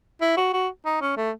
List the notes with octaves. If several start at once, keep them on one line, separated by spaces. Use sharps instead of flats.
E4
F#4
F#4
D#4
C#4
A3